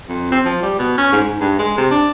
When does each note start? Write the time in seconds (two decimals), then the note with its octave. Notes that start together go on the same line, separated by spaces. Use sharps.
0.09 F2
0.32 C4
0.45 F3
0.62 G3
0.79 B2
0.98 C#4
1.12 G#2
1.24 G#2
1.40 G2
1.59 G#3
1.77 C3
1.91 D4